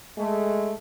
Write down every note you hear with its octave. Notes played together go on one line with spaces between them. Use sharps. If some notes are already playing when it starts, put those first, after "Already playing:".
G#3 A3